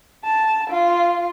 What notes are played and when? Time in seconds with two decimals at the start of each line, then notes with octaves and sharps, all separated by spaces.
0.24 A5
0.70 F4